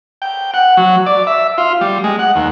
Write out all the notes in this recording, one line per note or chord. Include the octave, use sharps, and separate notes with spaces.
G5
F#5
F#3
D5
E5
F4
G3
G#3
F#5
D#2